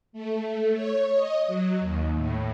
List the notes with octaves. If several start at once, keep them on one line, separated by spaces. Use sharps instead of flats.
A3
C#5
D#5
F#3
D#2
A2